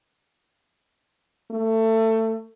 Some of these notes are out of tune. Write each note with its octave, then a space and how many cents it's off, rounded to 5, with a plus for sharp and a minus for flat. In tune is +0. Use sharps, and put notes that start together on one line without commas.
A3 +20